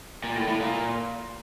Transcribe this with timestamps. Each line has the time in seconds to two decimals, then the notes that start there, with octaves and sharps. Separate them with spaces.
0.24 A#2
0.36 A2
0.48 A2
0.61 A#2